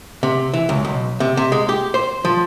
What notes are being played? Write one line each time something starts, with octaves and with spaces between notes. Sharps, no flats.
C3
E3
C#2
B1
C3
C3
G#3
G4
C5
F3